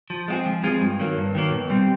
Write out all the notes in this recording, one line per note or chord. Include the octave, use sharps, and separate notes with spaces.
F3
G#3 C4 F4 G#4
F3
G#3 C4 F4 G#4
G2
D#3 F#3 A#3
G2
D#3 F#3 A#3
B2
G3 C4